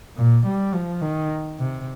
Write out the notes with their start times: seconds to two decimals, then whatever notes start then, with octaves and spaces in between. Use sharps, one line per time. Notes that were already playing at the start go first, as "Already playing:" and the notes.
0.16 A#2
0.46 G3
0.74 F3
1.01 D#3
1.59 C3